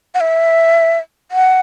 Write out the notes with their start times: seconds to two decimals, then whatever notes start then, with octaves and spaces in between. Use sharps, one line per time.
0.15 F#5
0.20 E5
1.31 F#5